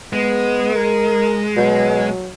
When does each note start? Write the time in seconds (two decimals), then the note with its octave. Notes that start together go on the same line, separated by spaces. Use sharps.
0.13 G#3 B3
0.75 A#4
1.56 B2 F#3